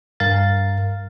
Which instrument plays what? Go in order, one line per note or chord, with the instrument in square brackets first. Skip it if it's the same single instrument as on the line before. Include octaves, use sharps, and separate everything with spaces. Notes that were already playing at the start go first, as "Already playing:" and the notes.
[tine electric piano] G2 A#4 F5 A6